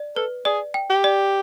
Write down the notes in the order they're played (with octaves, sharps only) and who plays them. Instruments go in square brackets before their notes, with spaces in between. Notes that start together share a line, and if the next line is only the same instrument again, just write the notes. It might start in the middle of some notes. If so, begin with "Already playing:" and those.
Already playing: [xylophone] D5
[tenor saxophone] A4 [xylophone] B4
[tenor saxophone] G#4 [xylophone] D5
[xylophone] G5
[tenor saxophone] G4
[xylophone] D5